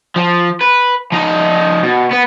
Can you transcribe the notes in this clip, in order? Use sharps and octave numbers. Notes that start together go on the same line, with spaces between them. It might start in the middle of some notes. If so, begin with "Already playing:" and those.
F3
B4
F3 D#4
B2
B3 B4